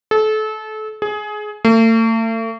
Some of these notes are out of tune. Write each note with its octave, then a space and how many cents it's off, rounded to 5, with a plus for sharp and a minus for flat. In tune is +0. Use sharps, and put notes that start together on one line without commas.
A4 -30
G#4 +20
A3 +40